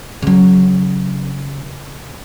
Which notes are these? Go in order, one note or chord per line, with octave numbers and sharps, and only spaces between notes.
C#3 F#3